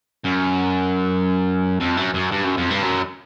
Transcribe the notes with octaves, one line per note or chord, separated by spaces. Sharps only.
F#2
F2
F#2
F#2
G2
F#2
F2
G2
F#2